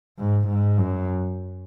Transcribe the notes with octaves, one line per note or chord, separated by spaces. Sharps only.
G#2
G#2
F#2